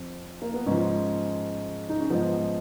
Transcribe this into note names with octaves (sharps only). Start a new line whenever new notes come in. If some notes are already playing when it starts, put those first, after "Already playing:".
Already playing: F2 F3
A#3
B3
G#2 F3 C#4
D#4
C#4
G#2 F3 B3